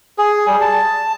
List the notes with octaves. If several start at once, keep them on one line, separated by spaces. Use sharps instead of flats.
G#4
G3
A5